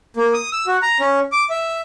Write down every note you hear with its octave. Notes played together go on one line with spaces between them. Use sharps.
A#3
D#6
E6
F#4
A#5
C#4
D6
E5